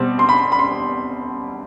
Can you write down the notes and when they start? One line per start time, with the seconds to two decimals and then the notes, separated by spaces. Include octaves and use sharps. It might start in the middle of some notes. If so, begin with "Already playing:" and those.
Already playing: B2 G3 C4
0.19 C6
0.29 B5
0.52 B5
0.59 C6